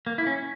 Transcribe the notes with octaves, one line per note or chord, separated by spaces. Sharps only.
A#3
E4
C#4